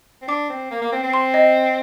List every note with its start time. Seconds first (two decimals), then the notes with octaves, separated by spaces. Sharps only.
0.22 C4
0.28 D4 D6
0.50 C4
0.71 A#3
0.82 A#3
0.92 C4
1.03 C4
1.13 C6
1.34 D#5